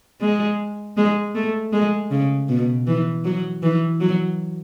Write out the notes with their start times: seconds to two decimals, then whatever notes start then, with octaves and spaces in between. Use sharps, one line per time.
0.21 G#3
0.97 G#3
1.35 A3
1.73 G#3
2.11 C#3
2.49 B2
2.87 E3
3.25 F#3
3.63 E3
4.01 F#3